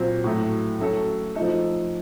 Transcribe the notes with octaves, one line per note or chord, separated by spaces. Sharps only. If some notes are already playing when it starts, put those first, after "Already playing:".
Already playing: A#2 F#3 C4
A2 F#3 A3
F#3 A3 C#4 A4
F3 A3 D#4 A4